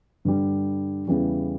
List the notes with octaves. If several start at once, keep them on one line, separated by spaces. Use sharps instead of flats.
G2 D3 G3
E2 C#3 E3 G3